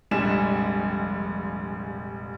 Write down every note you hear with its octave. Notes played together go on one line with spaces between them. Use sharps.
F1 A#1 G3 G#3 G#5 E7